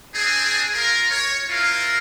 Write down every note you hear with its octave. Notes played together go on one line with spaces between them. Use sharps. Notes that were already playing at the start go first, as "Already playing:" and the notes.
C4 D4 G#4
F4 A#4
C#5
C4 E4 F4 A#4 F5